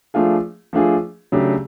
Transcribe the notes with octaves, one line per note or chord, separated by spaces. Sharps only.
F3 A3 D4 F4 G#4
F3 A3 D4 F4 G#4
C#3 F#3 A3 D4 G4